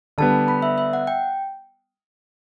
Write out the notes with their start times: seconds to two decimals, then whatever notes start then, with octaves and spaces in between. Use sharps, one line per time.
0.18 D3 G3 B3 A5
0.48 B5
0.62 E5
0.78 E5
0.93 F#5
1.07 G5